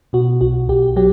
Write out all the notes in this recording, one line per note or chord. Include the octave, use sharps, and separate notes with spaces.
B2 F#4
B1 F#4
B1 G4
F#3 G4